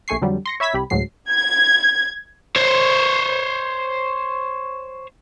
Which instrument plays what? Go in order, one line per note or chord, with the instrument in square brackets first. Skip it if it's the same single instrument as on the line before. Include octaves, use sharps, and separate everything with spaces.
[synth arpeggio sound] A#1 A3 G#5 C#6 C7
F2 D3 F#3 G3
C6 A#6 C#7
C#5 E5 B5 E6 G#6 B6
C2 G4 B5
D2 A2 F#3 G#3 C7
[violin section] G#6
[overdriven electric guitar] C5 C#5